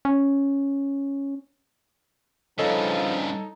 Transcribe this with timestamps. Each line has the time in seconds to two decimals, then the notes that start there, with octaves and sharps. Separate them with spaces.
0.05 C#4
2.59 G2 C#3 F3 D#4 A4 C#5 D#5